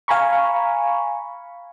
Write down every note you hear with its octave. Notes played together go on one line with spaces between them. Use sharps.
F5 G#5 A#5 B5 C#6